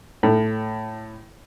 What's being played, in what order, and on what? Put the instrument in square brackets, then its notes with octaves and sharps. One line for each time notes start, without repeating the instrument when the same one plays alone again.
[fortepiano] A2